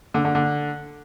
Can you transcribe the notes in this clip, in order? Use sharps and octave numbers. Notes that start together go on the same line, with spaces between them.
D3
D3
D3